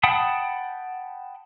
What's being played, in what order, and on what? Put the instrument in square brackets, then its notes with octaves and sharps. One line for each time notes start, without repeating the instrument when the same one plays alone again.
[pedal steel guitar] F#5 G5 A5 B5 D#6